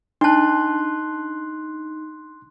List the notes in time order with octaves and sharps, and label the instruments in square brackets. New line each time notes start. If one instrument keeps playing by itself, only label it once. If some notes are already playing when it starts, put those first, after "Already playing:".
[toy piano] D4 A5 [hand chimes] D#4 [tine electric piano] C6 F#6